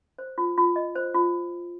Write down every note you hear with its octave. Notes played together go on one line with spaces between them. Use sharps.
C5
F4
F4
D#5
C5
F4